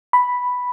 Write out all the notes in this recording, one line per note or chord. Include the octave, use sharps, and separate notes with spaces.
B5